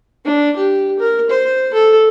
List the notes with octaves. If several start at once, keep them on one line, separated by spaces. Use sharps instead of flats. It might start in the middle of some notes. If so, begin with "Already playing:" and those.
D4
G4
A#4
C5
A4